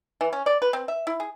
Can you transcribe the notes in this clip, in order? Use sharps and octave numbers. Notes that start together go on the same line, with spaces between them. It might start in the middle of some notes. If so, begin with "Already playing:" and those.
E3
C#4
D5
B4
C4
E5
E4
G#4